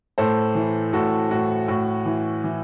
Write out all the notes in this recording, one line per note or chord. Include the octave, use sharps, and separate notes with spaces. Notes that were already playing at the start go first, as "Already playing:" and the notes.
A2 A4 C5
E3
A2 F#4 A4
A2 F#4
A2 F#4
E3
E3